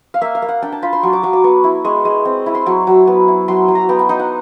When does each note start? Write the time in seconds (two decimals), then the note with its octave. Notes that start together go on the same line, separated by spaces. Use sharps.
0.14 F5
0.21 A#3 E5
0.35 F5
0.42 A#3
0.49 F#5
0.62 D4 G5
0.72 A5
0.83 F4 B5
0.93 C6
1.03 F#3 C#6
1.13 D6
1.23 F#3 C#6
1.33 D6
1.44 B3 C#6
1.64 E4
1.85 G#3 C#6
2.05 G#3
2.25 C4
2.46 E4
2.55 C6
2.66 F#3 C#6
2.87 F#3
3.07 B3
3.28 E4
3.48 F#3 C6
3.68 F#3
3.75 A#5
3.89 B3 G5
3.99 G5
4.09 D#4 G5
4.19 F#5